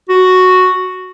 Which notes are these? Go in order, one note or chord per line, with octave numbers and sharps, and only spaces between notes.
F#4